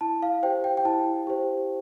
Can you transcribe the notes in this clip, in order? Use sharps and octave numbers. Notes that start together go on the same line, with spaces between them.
E4 A5
F5
G4 C5 G5
G5
G5
E4 A5
G4 C5